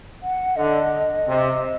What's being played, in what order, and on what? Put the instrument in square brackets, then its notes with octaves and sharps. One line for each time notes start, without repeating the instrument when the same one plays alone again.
[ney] F#5
[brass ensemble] D3 [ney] D#5
[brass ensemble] C3